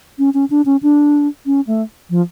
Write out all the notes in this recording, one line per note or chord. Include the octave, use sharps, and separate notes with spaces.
C#4
C#4
D4
C#4
D4
C#4
A3
F3